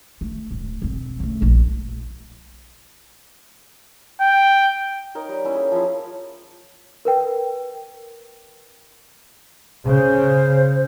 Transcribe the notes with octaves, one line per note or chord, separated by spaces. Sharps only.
A3
D1
E1 C4
C#3 A3
A#1 F2
G5
D#4 A#4 C#5
G3
A#3 C#4 E4
G#4
F3 E4
A#4 B4 G5
C#3 C5